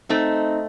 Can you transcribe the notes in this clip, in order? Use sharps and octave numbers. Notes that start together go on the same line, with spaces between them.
A3 C4 D#4